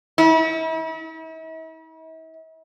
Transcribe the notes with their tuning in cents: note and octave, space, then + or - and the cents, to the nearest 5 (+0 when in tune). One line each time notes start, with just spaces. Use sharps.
E4 -45